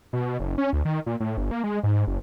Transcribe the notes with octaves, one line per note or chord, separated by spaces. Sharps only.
B2
F#1
C#4
D2
D#3
A#2
A2
G1
A#3
G#3
G#2
F#1